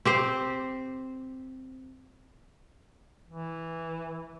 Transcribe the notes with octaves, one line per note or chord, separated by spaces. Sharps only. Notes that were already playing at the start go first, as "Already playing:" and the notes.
C4 G4 C5
E3